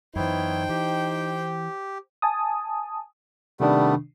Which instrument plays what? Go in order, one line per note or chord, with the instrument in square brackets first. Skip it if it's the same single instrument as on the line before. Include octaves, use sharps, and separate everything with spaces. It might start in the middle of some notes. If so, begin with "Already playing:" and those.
[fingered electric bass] F#2 E3 [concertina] B3 E4 C#5 [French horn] D#4 [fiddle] C5 G5
[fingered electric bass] E3 [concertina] G4
[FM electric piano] G#5 A5 D#6
[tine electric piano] C3 D#3 D4 [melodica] G3 A3 B3